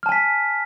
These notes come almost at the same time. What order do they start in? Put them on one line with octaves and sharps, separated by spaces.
F6 A5 G#5 B6